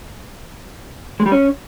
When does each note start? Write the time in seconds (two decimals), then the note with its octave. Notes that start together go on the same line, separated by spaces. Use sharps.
1.20 G#3
1.26 G3
1.32 C#4